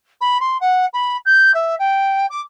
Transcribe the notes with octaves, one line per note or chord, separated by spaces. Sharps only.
B5
C6
F#5
B5
G6
E5
G5
D6